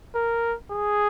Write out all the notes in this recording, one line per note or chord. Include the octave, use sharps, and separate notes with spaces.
A#4
G#4